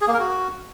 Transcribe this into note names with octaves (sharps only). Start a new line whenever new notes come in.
G#4
A#3
A#4
F#4